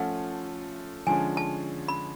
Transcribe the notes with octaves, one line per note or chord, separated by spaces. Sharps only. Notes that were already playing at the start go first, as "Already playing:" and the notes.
Already playing: F3 A3 C#4 F4 F#5
D3 F3 G#3 C#4 G#5
A5
B5